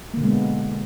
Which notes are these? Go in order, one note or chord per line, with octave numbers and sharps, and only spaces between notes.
B2 D3 G#3 A#3 B3